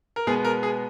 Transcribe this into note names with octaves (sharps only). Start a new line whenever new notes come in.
A#4
B2 G#3 B3 G#4
A#4
G#4